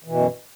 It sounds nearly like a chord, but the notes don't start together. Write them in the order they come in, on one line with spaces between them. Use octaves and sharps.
E3 B2 F#2